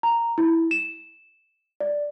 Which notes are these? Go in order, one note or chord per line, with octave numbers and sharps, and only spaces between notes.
A#5
E4
E7
D5